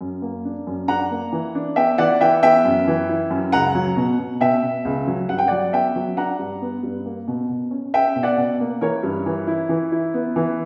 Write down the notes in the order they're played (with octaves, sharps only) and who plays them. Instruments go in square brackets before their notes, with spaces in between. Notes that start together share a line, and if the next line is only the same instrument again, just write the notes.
[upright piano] F#2
A#3
D4
F#2
D4 F#5 A#5
A#3
E3
D4
B3 E5 G5
E3 D5 F#5
E3 E5 G5
B3 E5 G5
F#2
E3
E4
F#2
C#2 F#5 A#5
F#3
B2
B2
B2 E5 G5
B2
C#2
F#3
G2 F#5
G5
F#3 D5 F#5
B3 E5 G5
F#3
D4 F#5 A#5
G2
B3
G2
A#3
B2
B2
C#4
C#4 E5 G5
B2
D5 F#5
B2
A#3
E3 A#4 C#5
G2
E3
E4
E3
E4
B3
E3